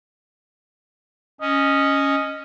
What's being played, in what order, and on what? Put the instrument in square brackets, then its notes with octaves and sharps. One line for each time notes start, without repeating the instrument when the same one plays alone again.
[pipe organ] C#4 [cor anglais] D#5